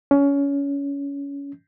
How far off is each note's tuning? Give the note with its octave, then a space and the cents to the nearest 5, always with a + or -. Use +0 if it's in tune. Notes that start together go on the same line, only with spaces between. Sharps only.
C#4 +20